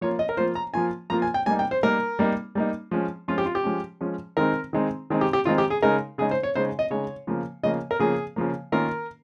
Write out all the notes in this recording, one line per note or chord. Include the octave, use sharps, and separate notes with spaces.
F3 A#3 F4 C#5
D#5
A#4
F3 A#3 F4 C5
A#5
F3 A#3 F4 G#5
F3 A#3 F4 A#5
G#5
G5
G3 A#3 D#4 G#5
G5
C5
G3 A#3 D#4 A#4
G3 A#3 D#4
G3 A#3 D#4
F3 G#3 C#4
F3 G#3 C#4 F4
G4
F4
G4
F3 G#3 C#4
F3 G#3 C#4
D#3 G#3 C4 D#4 A#4
D#3 G#3 C4 D#4
D#3 G#3 C4 D#4
G4
G4
D#3 G#3 C4 D#4 F4
G4
G#4
C#3 G#3 D#4 A#4
C#3 G#3 D#4 G#4
C5
C#5
C#3 G#3 D#4 C5
D#5
C#3 G#3 D#4 C#5
C#3 F3 A#3
C#3 F3 A#3 D#5
A#4
C#3 F3 A#3 G#4
C#3 F3 A#3
D#3 A#3 C#4 F4 A#4